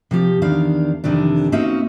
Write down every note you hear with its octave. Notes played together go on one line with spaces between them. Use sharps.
C3 F3 G4
E2 D#3 D4 F5
F2 C3 D#3 E3 D4
A#3 C4 C#4 D#4 F#4 E5